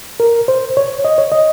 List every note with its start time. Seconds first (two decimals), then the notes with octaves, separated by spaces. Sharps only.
0.20 A#4
0.48 C5
0.77 C#5
1.05 D#5
1.18 C#5
1.32 D#5